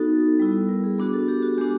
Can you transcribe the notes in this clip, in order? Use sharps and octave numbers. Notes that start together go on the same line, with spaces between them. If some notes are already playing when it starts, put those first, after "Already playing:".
Already playing: B3 D#4 F#4 A4
G3 B3 E4
A#4
G#4
B3 D4 F#4 G#4
A4
G4
F#4
G#3 B3 D4 G4